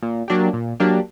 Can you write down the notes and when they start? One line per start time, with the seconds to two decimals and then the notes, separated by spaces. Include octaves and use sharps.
0.03 A#2
0.28 F#3 A#3 D4 G4
0.53 A#2
0.80 F#3 A#3 D4 G4